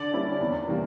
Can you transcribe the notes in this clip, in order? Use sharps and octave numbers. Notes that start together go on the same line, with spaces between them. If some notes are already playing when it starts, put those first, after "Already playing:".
Already playing: D3 D5
G3 A#3 C#4 E4
E2
C3 E3 G3 A#3